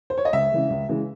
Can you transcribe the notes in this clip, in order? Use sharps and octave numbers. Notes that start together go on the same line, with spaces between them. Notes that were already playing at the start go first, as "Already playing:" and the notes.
C5
C#5
D#5
C#2 E5
C#3 E3 G#3
C#2
C#3 E3 G#3